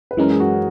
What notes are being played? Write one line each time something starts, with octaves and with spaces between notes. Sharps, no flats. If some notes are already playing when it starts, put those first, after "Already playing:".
B4
F#2 E3 G#3 C#4 A#4
G#4
F#4